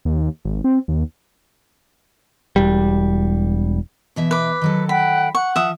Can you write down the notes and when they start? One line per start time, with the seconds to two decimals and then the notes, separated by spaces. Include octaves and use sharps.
0.05 D#2
0.45 G#1
0.64 C4
0.88 D#2
2.56 E1 G3
4.16 B2 E3 E5
4.31 B4 D6
4.62 D#3 F#3 A4
4.89 F#5 G5 B5
5.35 F#5 C#6
5.56 F3 E5 D#6